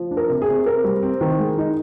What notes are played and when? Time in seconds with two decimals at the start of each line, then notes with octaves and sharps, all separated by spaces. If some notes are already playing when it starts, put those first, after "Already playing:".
Already playing: F3
0.11 D4
0.17 A#4
0.29 C3
0.42 G#4
0.48 C3
0.66 C4 A#4
0.84 G3
1.02 C4
1.21 D#3
1.39 G#3
1.58 D#4